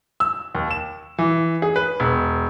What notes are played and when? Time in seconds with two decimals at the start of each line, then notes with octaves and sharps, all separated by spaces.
0.20 E6
0.55 D#2
0.71 E7
1.18 E3
1.62 G#4
1.76 B4
2.00 E1